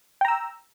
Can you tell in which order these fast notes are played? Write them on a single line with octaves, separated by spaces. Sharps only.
G5 A#5 E6